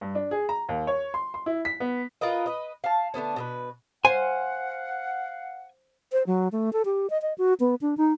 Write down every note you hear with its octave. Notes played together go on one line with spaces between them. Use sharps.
G2
D4
G#4
A#5
D#2
C#5
C6
C6
E4
B6
B3
F4 A#4 B4 D#5
B4 D#5
F5 A5
D3 A3 B3 C#4
B2 A4 B4
C5 F5 F#5 G#5
C5
F#3
A3
A4
G4
D#5
D#5
F#4
B3
D4
D#4